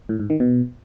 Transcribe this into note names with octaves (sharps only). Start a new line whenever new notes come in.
A2
G#2
D#3
B2